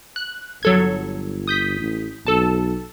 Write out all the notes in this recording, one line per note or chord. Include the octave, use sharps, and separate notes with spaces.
F#6
G1 F#3 A4 G#6
D#6 G6 B6
A1
B1 A4 A5